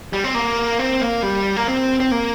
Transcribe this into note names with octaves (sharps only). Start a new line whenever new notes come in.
G3
C4
A#3
C4
A#3
G3
A#3
C4
C4
A#3